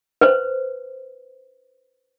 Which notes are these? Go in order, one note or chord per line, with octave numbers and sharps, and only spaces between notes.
B4 C5